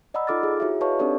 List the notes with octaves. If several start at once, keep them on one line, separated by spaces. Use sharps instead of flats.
D5 D#5 F#5 A#5 B5 E6
D#4 F4 A4 D6 F6 A6
G#4
E4 F#4 G#4 C#5 E5
B4 C#5 D#5 F5 A5 C#6
C4 D4 D#4 G4 A4 D5